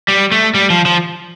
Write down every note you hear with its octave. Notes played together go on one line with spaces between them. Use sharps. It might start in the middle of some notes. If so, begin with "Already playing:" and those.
G3
A3
G3
F3
F3